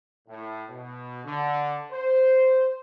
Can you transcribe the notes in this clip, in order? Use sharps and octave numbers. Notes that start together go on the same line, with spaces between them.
A2
B2
D3
C5